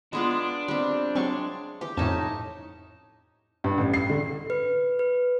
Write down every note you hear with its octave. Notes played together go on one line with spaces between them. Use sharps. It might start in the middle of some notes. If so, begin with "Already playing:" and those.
G#3 B3 D4 F4
G3 C4
F#3 G#3 C4 F5 C#6
E3 G4
F2 A2 C#4 D#4 A5
G2
A1
C7
D3
B4
B4